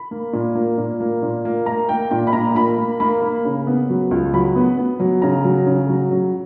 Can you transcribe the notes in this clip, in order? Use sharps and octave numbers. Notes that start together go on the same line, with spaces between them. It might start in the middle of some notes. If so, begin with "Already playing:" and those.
Already playing: B5
A#3
A#2
A#3
A#2
A#3
A#2
A#3
A#3 A#5
A#3 G5
A#2 G5
B5
A#2 A#5
A#3 B5
A#3
A#3 B5
A#3
C#3
B3
F#3
C#2
F#3 B5
B3
B3
F#3
C#3 A#5
F#3
C#3
F#3
F#3